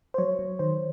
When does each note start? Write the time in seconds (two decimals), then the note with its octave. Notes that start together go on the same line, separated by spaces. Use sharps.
0.14 C5
0.18 F#3 C#5
0.39 F#3
0.59 D#3 C5